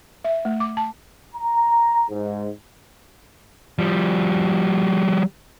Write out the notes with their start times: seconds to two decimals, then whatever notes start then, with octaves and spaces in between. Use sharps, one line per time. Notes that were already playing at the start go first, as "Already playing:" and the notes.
0.24 E5
0.45 A3
0.60 D6
0.77 A5
1.35 A#5
2.09 G#2
3.79 F3 G3